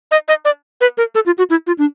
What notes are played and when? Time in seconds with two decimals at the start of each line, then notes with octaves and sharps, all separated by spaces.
0.11 D#5
0.28 D#5
0.45 D5
0.81 B4
0.98 A#4
1.15 A4
1.26 F4
1.38 F#4
1.50 E4
1.67 F4
1.78 D4